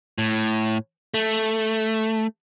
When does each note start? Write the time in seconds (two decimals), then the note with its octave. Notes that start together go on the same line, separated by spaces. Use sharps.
0.18 A2
1.14 A3